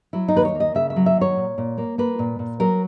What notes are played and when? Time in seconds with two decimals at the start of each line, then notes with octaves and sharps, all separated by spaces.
0.13 F#3 E4
0.28 D#4
0.35 D#2 B4
0.45 C#5
0.55 A#3
0.60 D#5
0.75 C#3 E5
0.90 E5
0.96 F#3
1.06 E5
1.16 D#2
1.21 C#5
1.36 A#2
1.58 A#2
1.78 A#3
1.98 A#3 B4
2.19 A#2
2.39 A#2
2.60 F#3 A#4